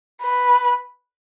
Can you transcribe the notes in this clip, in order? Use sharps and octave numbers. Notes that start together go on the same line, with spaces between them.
B4